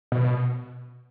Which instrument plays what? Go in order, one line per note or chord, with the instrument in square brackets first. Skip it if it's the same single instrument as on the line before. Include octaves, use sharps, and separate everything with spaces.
[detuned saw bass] B2